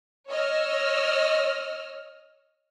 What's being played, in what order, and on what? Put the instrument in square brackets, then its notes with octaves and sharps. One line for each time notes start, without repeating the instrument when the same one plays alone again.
[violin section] C#5 D#5 E6 F6